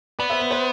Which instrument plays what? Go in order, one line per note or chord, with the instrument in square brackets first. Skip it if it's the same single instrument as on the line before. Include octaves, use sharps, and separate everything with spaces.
[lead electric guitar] B3 [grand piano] B4 D5
[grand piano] C5 E5
B4
C5